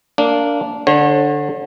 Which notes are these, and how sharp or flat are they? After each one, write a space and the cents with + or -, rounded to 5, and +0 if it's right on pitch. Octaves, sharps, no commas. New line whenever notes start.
A#3 -15 D4 -15
D3 +0 C#5 -35